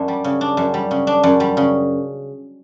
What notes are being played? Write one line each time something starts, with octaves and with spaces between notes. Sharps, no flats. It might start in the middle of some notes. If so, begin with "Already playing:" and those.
Already playing: F#2 D4
G3
C#3
D4
F#2
G3
C#3
D4
F#2
G3
C#3